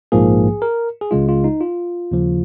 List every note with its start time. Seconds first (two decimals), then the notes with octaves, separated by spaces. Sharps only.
0.12 A#1 G#2 F3 A#3 G#4
0.62 A#4
1.01 G#4
1.11 C#2 C#3 G#3 F4
1.29 F4
1.44 D#4
1.61 F4
2.11 D#2 C#3 F3